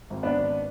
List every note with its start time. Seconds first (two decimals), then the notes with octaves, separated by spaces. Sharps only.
0.10 G#1
0.23 B3 D4
0.36 G#1